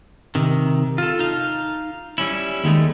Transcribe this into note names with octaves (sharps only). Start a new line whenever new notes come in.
C3 D#3
F4 A4
D#4 F5
G3 C#4 E4
D#2 D#3 G#3 A3